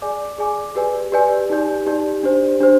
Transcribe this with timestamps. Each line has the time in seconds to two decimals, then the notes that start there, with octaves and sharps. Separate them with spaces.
0.02 G#4 D5 G#5 D6
0.38 G#4 D5 G#5 D6
0.76 G4 B4 D5 G#5
1.12 G4 B4 D5 G#5
1.50 D#4 G4 D5
1.86 D#4 G4 D5
2.23 D4 G4 C5
2.60 D4 G4 C5